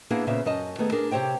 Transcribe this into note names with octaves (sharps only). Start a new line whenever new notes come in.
A#3 B3 D4 E4 G#4 F#5
A#2 C#3 B3 G#4 C5 E5
F#2 C#4 D#5 A5
D#3 A3 B3 G#4
D4 G#4 A#4
C3 G4 C5 C#5 G5